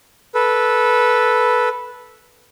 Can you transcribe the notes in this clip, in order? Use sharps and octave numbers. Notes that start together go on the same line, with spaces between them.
A4 B4